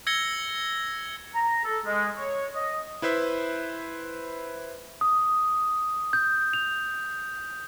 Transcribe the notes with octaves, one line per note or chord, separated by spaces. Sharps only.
E6 G#6 A#6 C#7 G7
A#5
A4
G#3
C#5
D#5
E4 B4 C5 E5
D#6
G6
F7